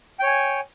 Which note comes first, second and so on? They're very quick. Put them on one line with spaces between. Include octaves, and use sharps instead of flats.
G5 C#5 G#5